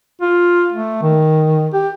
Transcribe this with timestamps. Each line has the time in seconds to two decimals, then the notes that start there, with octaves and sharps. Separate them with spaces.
0.21 F4
0.72 A3
1.02 D#3
1.73 G4